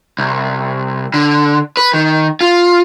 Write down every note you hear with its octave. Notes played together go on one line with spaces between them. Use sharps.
C2
D3
B4
D#3
F4